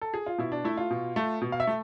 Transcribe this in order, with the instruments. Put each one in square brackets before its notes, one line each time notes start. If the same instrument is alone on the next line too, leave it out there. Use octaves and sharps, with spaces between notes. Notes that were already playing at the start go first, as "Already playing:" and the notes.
[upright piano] A4
G#4
F4
B2 E4
D4
A3 E4
F4
B2
A3
B2
F5
E5
A3